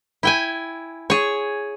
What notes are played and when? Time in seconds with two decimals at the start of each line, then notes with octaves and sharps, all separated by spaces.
0.23 E4 G5 G#5
1.10 G#4 C#5